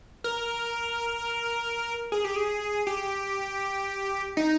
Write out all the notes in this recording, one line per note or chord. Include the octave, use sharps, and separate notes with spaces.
A#4
G#4
G4
G#4
G4
D#4